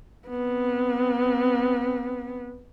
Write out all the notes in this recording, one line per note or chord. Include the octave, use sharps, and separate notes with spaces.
B3 C4